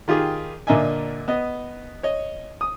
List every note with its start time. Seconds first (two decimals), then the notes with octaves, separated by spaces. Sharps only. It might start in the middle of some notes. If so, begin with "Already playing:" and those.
0.08 D#3 F4 G4 G#4
0.67 A#2 D3 A#3 D#5 E5 G#5
1.28 B3 D#5
2.03 C#5 D#5
2.61 D#6